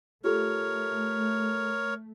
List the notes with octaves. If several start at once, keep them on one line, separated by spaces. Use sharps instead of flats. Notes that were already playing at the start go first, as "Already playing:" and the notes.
A3 F4 G4 A4 A#4 C#5